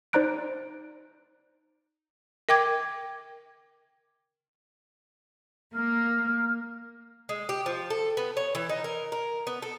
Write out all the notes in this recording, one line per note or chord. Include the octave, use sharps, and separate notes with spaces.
D#4 C5 D5 A#5 F#6 D7
A#4 G5 D6 G#6
A#3 F6
G#3
G4
F3
A4
B3
C#5
E3
D#4
A#4
A#4
B3
A4